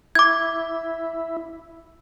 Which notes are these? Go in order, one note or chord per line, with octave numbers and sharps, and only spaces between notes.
E4 D6 G#6